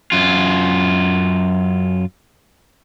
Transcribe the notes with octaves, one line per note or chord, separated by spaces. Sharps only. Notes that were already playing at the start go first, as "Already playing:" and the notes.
F#2 F4